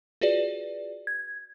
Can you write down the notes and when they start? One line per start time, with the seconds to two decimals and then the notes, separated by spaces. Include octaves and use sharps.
0.21 F4 F#4 G#4 B4 D5
1.07 G#6